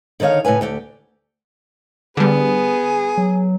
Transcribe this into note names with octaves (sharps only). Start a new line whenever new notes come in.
D3 D#3 D#4 C#5 F5
A2 C#3 B4 G#5
D2 A3 G4
D3 G3 B3 G#4
F#3